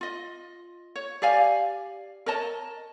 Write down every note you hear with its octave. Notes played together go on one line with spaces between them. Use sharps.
F4 D#5
C#5
G4 D5 F5 G#5
A#4 C#5 D#5 A5